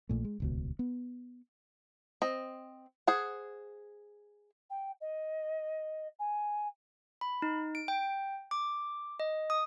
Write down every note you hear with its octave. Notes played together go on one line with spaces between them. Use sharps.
A#1 A#2 A3
G#3
D#1 C#2 B2
B3
C4 D#5
G#4 C5 F#5
G5
D#5
G#5
B5
D#4
D7
G5
D6
D#5
D#6